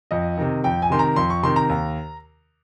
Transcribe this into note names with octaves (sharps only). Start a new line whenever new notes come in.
F2 D#5
C3 D#3
F2 G5
G#5
C3 D#3 C6
A#5
F2 C6
C#6
C3 D#3 C6
A#5
D#2